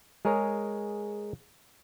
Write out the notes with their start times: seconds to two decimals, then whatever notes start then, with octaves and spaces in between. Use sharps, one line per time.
0.25 G#3 G#4 A#4 C#5